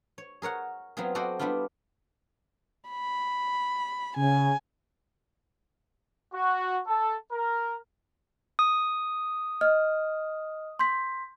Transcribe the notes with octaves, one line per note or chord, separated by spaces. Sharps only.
C#5
G#4 A#4 C#5 F#5
F#3 B3 C4 F4 G#4
F#4 A4 C5 D5 D#5
G3 B3 D4 E4 F4
B5
C#3 G#5
F#4
A4
A#4
D#6
D#5 F6
C6 G6 B6